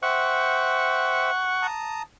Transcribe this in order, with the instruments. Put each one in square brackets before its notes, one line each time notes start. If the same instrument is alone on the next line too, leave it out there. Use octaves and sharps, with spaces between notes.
[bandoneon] C5 E5 G5 [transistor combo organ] F#5 C#6
[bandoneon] A5 A#5 D#6